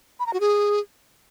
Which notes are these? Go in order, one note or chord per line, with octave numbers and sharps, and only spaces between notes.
B5
A#5
F#4
G#4